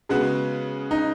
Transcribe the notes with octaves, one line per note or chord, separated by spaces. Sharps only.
C#3 G#3 B3 F#4
D#4